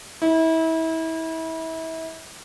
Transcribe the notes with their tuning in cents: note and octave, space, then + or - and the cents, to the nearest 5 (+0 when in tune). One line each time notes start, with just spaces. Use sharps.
E4 -30